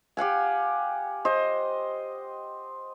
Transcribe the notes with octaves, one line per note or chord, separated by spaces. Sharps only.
G4 F5 F#5 G#5
C5 D#5